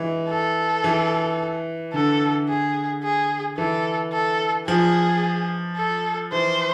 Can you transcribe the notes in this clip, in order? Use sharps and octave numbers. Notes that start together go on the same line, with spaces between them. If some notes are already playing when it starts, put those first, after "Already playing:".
Already playing: E3 G#3
A4
E3
D3 A4
G#4
G#4
E3 A4
A4
F3 G#4
A4
E3 C5